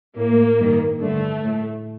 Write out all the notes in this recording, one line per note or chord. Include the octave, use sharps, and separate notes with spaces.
A2 A#3
G2 D#3
G2 D3 A3
A2